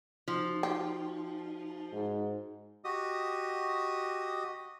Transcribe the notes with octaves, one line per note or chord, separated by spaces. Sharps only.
F3 D#4 F#4
G4
G#2
F#4 G4 D#5 D#6